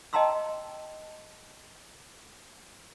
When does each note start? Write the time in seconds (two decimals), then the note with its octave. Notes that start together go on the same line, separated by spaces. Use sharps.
0.13 D#5 G5 A5 A#5 C6 E6